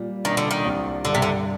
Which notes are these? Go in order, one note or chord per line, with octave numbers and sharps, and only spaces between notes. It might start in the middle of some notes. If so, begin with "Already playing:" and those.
Already playing: A#2 G3
D#3 D4
D3
D#3
C2
G2 D3
C3
D3